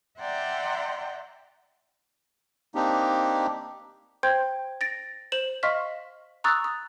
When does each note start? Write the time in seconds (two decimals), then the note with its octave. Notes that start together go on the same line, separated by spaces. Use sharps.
0.19 D5 E5 F#5 G5 A#5 C6
2.75 A#3 C4 D4 D#4 G4
4.23 C5 G5 C6 G6 G#6
4.81 A6 A#6 D7
5.32 C5 E7 F#7
5.63 D#5 F5 C6 C#6 F6 B6
6.44 A#5 C#6 D#6 E6 F#6 A6
6.64 D#6